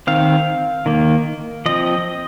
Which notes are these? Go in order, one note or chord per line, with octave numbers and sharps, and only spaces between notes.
D#3 C4 F5
D#3 A#3
F3 C4 D#5